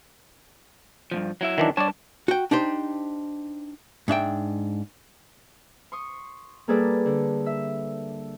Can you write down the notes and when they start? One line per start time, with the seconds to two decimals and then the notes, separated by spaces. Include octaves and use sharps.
1.11 G2 A#2 F3
1.41 F#3 E4 E5
1.58 D#3 E3 D4
1.77 G3 D4 C#5 D5 A5
2.28 F#4 G5
2.51 D4 D#4 G4 C5
4.08 G#2 D4 E5 G5
5.92 C6 C#6 D#6
6.68 G3 A#3 G#4 A4 B4 D5
7.06 D3
7.46 E5